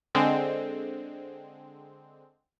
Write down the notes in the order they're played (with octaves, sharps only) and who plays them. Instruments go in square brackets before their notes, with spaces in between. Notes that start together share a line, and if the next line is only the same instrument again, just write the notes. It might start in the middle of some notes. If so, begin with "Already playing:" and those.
[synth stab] D3 G#3 C4